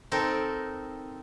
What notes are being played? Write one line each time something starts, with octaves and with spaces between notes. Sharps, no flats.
C4 D#4 A4 A#4